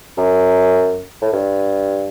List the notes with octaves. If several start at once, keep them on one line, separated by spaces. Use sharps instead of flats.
F#2
A2
G2